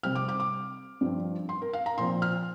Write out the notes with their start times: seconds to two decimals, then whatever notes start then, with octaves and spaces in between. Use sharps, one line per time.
0.03 C3 G3 C4 F6
0.15 D6
0.29 D6
0.40 D6
1.01 G2 F3 C4
1.49 C6
1.62 A#4
1.73 F5
1.86 A#5
1.98 A#2 F3 C4 C6
2.22 F6